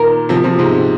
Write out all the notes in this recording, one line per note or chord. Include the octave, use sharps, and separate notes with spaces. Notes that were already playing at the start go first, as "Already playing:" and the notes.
Already playing: A#2 D#3 A#4
C3 F3
C3 F3
G#2 C3